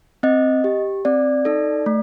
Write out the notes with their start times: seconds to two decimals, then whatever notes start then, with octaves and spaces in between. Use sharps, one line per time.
0.23 C4 D#5
0.64 G4
1.05 C4 D5
1.45 D#4 A4
1.86 A3